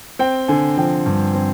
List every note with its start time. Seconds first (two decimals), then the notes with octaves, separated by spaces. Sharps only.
0.19 C4 G5
0.48 D3 G#5
0.77 F3 G5
1.06 G2
1.35 C4